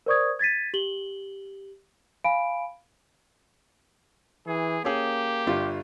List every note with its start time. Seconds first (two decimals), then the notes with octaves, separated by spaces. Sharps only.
0.06 A#4 C5 D5 C#6 D#6 G#6
0.39 G#6 A6 B6 D#7
0.74 G4 F#7 G7
2.24 F5 G#5 B5 D7
4.47 E3 G#4
4.85 A#3 C#4 G4 G#4
5.47 G1 G3 F4